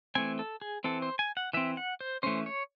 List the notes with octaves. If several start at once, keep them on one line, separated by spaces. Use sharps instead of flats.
E3 A3 C4 G#5
A4
G#4
E3 C4 A4
C5
G#5
F#5
E3 C4 E5
F#5
C5
E3 A3 C#4 C5
C#5